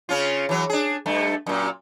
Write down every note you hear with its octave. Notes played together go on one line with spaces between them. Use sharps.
C#3 C#4 F4
E3 F#3
D4 G#4
G2 A3
F#2 A#2